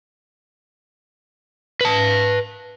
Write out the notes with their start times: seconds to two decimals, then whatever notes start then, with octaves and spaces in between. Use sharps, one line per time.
1.81 B4 A5